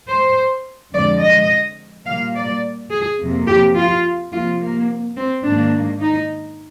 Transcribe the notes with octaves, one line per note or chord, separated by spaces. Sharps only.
C5
F2 D3 G#3 D5
D#5
A#2 G3 A#3 F5
D5
G#4
F2 C3 F3 A#3
G4
F4
C3 F3 A#3 F4
A#3
C4
G#2 D#3 A#3 D4
D#4